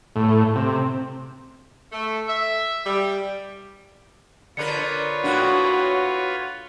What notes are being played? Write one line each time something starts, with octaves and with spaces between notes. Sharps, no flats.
A2
C3
A3
E5
G3
D3 D4 F4 A#4 B4 C#5 C#7
A2 A#3 D4 E4 F#4 F#6